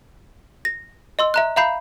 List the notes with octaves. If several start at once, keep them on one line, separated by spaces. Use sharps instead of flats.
A#6
D#5 C6 E6
E5 A#5 F#6
E5 F5 A#5 B5 G6 C7